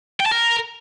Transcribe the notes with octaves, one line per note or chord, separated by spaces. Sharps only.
G5
A5
A#4